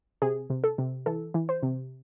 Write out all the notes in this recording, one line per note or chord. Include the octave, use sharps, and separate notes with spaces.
C3 G#4
C3
A4
C3
E3 A4
E3
C5
C3